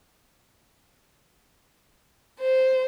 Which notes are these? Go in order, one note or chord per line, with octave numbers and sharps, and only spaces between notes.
C5